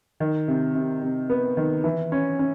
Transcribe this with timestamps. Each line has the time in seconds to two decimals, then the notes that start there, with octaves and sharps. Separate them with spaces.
0.20 D#3
0.48 C3
0.75 C3
1.02 C3
1.30 B3
1.57 D#3
1.84 E3
2.12 C#4
2.39 C#4